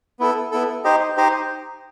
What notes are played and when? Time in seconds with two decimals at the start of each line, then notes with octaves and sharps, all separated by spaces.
0.19 B3 E4 A4
0.52 B3 E4 A4
0.84 D#4 G4 C5 D#5
1.17 D#4 G4 C5 D#5